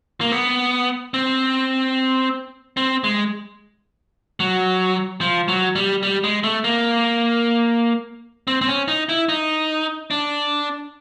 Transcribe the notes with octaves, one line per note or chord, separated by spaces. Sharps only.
A#3
B3
C4
C4
G#3
F#3
F3
F#3
G3
G3
G#3
A3
A#3
C4
C4
C#4
D#4
E4
D#4
D4